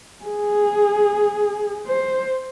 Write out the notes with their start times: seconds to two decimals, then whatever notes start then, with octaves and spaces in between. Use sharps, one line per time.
0.24 G#4
1.87 C5